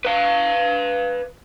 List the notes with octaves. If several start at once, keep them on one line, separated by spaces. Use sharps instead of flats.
B4 F5